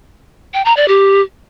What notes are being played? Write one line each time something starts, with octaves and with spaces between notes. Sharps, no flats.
G5
A#5
D5
G4